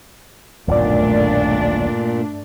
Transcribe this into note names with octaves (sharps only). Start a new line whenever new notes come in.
D#1 B1 E2 G2 A#2 A3 D4 D5